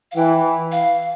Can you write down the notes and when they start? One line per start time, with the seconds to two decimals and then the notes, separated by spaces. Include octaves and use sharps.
0.12 F5
0.16 E3 G5
0.72 F5